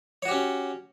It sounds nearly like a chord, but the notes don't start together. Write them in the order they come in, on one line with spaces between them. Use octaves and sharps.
C#5 F#4 G4 C#4